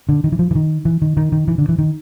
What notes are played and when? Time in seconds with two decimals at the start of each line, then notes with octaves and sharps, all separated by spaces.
0.09 D3
0.24 D#3
0.32 E3
0.39 F3
0.51 E3
0.55 D#3
0.85 E3
1.02 D#3
1.17 D#3
1.32 D#3
1.48 E3
1.58 D3
1.69 E3
1.78 D#3